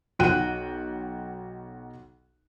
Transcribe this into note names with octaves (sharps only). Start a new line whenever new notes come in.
B1 F#4 F#5 G5 F#6 D#7